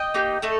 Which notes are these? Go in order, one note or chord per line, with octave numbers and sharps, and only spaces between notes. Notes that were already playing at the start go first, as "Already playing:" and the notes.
Already playing: D#5 G5
A#3 D#4 G4
A3 D#4 A4